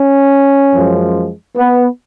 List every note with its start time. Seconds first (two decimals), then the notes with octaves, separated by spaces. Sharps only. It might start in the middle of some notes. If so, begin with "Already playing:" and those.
Already playing: C#4
0.74 F#2 F3 G#3
1.57 B3